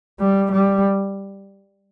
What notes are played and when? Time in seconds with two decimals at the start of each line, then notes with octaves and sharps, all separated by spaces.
0.20 G3
0.52 G3